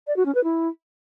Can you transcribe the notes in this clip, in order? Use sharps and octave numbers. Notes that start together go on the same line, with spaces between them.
D5
F#4
C#4
B4
E4